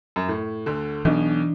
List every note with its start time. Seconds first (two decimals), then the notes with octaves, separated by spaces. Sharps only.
0.16 F#2
0.28 A2
0.66 D2 D3
1.05 B1 B2 E3 D4